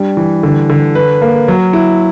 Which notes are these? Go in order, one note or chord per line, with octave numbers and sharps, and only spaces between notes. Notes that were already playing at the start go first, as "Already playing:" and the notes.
Already playing: G3 D4
E3
D3
D3
B4
A#3
F#3
E4